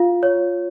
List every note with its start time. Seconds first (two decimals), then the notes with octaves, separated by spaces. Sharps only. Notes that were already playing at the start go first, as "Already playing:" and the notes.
Already playing: F4 F5
0.23 C#5